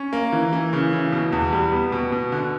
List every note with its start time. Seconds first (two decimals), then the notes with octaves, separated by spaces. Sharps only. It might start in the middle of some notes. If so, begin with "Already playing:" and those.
Already playing: C#4
0.13 A#3
0.33 E3
0.53 E3
0.73 C#3
0.93 E3
1.12 B2
1.32 E2
1.53 G3
1.72 B3
1.92 B2
2.12 B2
2.32 D3